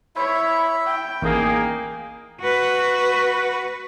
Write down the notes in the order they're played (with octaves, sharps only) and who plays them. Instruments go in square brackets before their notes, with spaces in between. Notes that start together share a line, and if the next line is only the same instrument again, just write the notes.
[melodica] E4 E5 [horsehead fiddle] C#5 B5
[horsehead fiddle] G5
[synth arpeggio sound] A1 [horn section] A#3 G#4 [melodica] D#4
[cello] F#4 B4